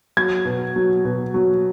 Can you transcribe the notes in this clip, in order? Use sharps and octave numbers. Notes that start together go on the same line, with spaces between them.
F#3 G#6
B2
F#3
B2
F#3